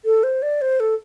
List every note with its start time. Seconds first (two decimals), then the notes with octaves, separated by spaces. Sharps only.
0.05 A4
0.23 C5
0.42 D5
0.61 C5
0.80 A4